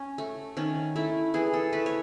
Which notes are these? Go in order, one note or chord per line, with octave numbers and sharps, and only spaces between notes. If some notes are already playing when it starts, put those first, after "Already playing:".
Already playing: C#4
A3
D#3 C#4
A3 E4
E3 G#4
A4
A3 B4
C#5